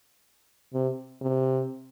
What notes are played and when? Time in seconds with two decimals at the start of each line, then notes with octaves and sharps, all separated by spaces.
0.74 C3
1.21 C3